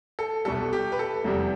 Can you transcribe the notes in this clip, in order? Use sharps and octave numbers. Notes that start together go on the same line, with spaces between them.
A4
C2 B2 G3 A4
G4
B4
A4
F1 E2 C3 G3